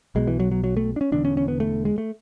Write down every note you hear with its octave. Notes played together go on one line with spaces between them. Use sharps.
B1 B2 G#3
E3
F#3
F#3
F#3
A3
D4
C#4
E1 E2 D3 D4
C#4
C#4
B3
A3
G#3
A3